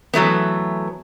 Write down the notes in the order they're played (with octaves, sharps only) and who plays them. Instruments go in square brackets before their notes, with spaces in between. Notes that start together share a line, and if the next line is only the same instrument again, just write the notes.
[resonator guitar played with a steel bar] E3 F#3 A3 B3